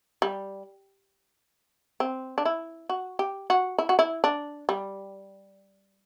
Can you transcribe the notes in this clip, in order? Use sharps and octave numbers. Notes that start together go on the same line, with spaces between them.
G3
C4
D4
E4
F#4
G4
F#4
E4
F#4
E4
D4
G3